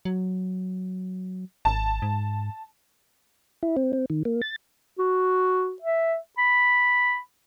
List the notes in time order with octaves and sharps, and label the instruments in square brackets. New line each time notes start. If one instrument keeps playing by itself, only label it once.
[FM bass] F#3
[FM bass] G#1 [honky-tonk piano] A5
[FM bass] G#2
[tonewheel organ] E4
C4
C4
D#3
A#3
A6
[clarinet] F#4
E5
B5